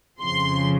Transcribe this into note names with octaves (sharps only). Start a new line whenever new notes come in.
F2 C#3 F3 C6